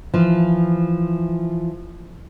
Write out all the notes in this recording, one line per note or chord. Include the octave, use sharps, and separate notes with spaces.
E3 F3